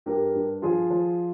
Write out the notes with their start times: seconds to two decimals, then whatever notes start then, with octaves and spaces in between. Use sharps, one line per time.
0.06 G2 G4 A#4
0.35 G2
0.62 F3 F4 G#4
0.90 F3